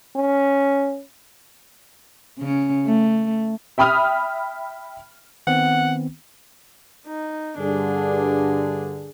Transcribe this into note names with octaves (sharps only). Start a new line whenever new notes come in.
C#4
C#3 C#4
A3
E5 G5 B5 D#6 F6
D#3 B3 C4 F#5
D#4
G2 D3 D4 G#4